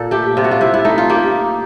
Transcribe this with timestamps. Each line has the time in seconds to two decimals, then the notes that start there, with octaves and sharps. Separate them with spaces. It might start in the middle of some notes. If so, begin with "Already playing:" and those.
Already playing: A#2 A4
0.11 A3 G4
0.37 C3 F4
0.44 F#4
0.51 F4
0.61 C3 E4
0.74 E4
0.85 A3 D#4
0.98 F4
1.09 A#3 G4